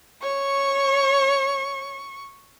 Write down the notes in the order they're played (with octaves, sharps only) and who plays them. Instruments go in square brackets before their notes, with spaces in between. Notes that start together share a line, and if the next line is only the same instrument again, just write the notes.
[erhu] C#5 [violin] C#6